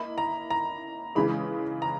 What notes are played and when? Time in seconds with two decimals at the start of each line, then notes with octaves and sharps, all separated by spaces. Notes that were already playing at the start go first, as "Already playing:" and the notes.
Already playing: A#3 E4 D#5 B5
0.18 A#5
0.50 A#5
1.15 C#3 E3 G#3 B5
1.82 A#5